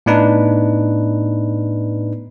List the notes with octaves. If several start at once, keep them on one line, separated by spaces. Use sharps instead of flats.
A2 B3 D4 D#4 B4